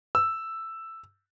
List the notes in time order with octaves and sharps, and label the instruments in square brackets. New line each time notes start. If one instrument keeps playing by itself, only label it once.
[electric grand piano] E6